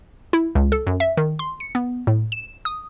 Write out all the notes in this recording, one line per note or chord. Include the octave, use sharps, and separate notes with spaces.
E4
C#2
A4
F#2
E5
D#3
C6
C#7
B3
A2
E7
D#6